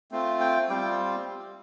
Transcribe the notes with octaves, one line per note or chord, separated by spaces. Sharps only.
A3 C4 F4
G5
G3 C4 F4 G5